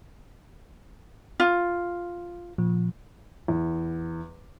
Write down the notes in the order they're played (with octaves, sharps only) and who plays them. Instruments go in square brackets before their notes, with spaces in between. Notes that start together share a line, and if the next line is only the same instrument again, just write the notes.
[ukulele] F4
[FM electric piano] A#2 F3
[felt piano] E2